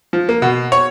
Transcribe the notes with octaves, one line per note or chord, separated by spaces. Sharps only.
F3
A#3
B2
C#5